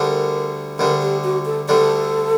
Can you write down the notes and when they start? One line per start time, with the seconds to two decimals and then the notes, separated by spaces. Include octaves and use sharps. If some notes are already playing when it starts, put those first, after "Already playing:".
Already playing: D2 D3 G3 D4 A#4
0.79 D2 D3 G3 D4 A#4
1.02 G4
1.24 F#4
1.46 A4
1.68 D2 D3 G3 D4 A4